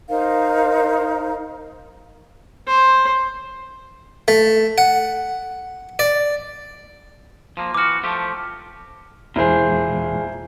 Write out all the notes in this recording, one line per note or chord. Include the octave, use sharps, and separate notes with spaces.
D#4 A#4 C5 F5
C5
A3
F#5
D5
F3 A#3
E3 F#4 D6 F6
F3 A3 G4
D#1 E2 A#2 E4 G#4 C5